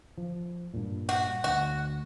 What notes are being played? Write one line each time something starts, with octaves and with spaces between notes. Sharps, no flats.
F3
G2 A#2
F#4
D2 F#4